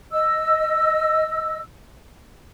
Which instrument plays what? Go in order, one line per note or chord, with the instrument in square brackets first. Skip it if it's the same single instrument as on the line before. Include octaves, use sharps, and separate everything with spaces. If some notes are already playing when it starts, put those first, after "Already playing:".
[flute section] D#5 E6